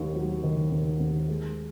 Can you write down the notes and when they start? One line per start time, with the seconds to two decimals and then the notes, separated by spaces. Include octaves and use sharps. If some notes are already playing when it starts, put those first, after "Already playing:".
Already playing: D#2 D#3
0.16 F#3
0.43 D#3
0.71 D#2
1.00 D#2
1.28 G#3